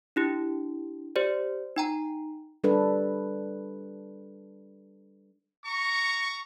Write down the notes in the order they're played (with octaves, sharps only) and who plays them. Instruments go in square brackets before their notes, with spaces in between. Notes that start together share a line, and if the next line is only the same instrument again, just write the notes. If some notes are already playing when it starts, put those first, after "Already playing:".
[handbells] D4 E4 G4
G4 C5 D5
D#4 G5 A#5
[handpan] G3 D4 A4 B4
[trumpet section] A#5 C#6